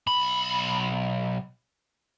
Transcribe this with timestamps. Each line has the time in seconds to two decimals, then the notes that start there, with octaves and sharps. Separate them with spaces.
0.07 B1 B5